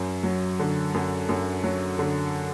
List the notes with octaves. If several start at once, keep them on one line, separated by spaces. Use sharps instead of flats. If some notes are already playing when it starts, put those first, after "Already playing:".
Already playing: F#2
F#3
D3
F#2
F#2
F#3
D3